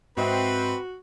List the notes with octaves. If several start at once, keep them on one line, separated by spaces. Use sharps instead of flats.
G#2 C4 F#4 B4 D#5 E5